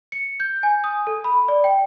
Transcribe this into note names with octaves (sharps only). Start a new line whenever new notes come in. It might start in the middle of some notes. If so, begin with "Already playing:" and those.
C#7
G6
G#5
D#6
A4
B5
D5
G5